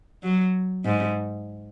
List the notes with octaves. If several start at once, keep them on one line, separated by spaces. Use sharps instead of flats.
F#3
G#2